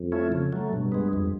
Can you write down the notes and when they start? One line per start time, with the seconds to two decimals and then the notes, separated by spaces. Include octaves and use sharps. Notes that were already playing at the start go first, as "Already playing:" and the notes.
Already playing: F2
0.12 F3 A3 C#4 E4
0.32 C#3
0.53 F#3 A3
0.72 G2 B2
0.92 G#3 B3
1.13 F2